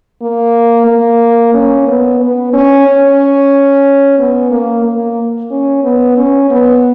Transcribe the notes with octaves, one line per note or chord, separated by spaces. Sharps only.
A#3
A#3
C#4
B3
B3
C#4
C#4
B3
A#3
A#3
C#4
B3
C#4
B3